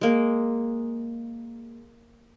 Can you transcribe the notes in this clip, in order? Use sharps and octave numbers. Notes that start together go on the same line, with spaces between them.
G#3 A#3